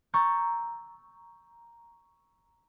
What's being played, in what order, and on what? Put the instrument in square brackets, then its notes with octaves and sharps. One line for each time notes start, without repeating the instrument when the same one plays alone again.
[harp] A#5 C#6 E6 G6 A6